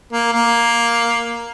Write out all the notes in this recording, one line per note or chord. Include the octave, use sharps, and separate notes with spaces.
A#3
A#3